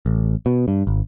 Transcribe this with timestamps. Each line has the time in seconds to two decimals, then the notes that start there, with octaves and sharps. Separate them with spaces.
0.06 A1
0.46 B2
0.68 G2
0.87 G#1